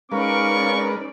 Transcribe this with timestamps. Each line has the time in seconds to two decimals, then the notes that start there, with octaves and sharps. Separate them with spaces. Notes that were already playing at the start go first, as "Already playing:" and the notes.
0.12 G#3 C#4 D#4 A#4 B4 D5 F5 C#6